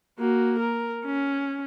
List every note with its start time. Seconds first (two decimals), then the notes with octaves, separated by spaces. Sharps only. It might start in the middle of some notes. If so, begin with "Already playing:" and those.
0.19 A#3 F#4
0.59 A#4
1.06 C#4